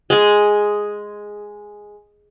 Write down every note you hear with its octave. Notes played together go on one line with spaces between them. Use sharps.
G#3 G#4